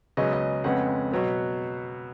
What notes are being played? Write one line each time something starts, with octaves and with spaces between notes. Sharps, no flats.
C#2 C#3 F#3 B3 D#5
D#5
F2 C#3 G#3 B3 F#5
B2 F#3 B3